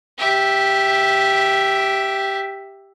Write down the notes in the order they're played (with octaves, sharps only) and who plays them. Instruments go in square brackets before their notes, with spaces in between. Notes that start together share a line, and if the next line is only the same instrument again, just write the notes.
[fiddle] G4 E5